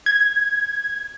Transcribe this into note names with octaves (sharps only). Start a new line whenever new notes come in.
G#6